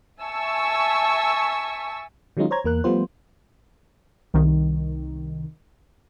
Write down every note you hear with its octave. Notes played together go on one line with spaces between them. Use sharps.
E5 G#5 A5 C#6 E6
D#3 F#3 G#3 C#4 D#4 F4
C5 C#5 A#5 G#6
E2 A#3 A#4 F#6
F3 G3 A3 B3 F4 C5
C2 D#3